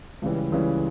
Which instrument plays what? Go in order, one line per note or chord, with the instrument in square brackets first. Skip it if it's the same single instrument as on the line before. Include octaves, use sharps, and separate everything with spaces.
[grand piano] C#2 C#3 E3 G3
C#2 C#3 E3 G3